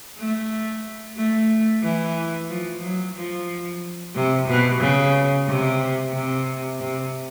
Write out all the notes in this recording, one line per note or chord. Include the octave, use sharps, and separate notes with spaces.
A3
A3
E3
F3
F#3
F3
C3
B2
C#3
C3
C3
C3